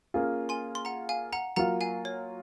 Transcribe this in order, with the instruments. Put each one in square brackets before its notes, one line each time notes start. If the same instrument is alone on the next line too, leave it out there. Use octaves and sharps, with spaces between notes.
[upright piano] A#3 C#4 F4 G#4
[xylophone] G#5 C6
C6
F#5 A#5
F5 G#5
F#5 A#5
[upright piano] F#3 A#3 F4 [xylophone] F#5 A#5
[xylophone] F5 G#5
C#5